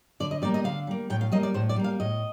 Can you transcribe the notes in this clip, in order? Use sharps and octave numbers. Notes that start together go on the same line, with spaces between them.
D3 D5
D#5
G3 A#3 D5
D#5
D3 F5
G3 A#3
A2 G5
F5
G3 A#3 D#5
D5
A2 C5
D5
G3 A#3
F5
A2 D#5